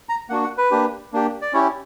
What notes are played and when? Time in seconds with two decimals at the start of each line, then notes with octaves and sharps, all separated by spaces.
0.09 A#5
0.29 A#3 D4 F#4 F#5
0.44 F#5
0.58 B4
0.71 A#3 D4 G4
1.13 A#3 D4 G4
1.42 D5
1.53 C#4 E4 G4 C#5